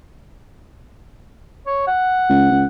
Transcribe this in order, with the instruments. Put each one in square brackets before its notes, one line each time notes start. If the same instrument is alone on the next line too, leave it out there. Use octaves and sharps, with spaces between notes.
[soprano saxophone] C#5
F#5
[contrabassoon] C#2
C#2